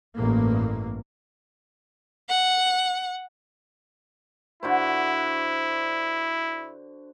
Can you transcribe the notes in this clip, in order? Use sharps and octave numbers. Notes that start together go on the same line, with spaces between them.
A1 G2 A3 A#3
F#5
D3 E4 F#4 C5